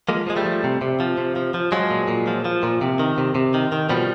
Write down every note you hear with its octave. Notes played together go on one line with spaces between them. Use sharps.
F3 G#3 A#3
F3 G#3
G3 A3
F3
C3
C3
F3
C3
F3
F3
F3 F#3 G#3
A#2
A#2
F3
F3
A#2
C3
D#3
C3
C3
D#3
D#3
B2 F3 G3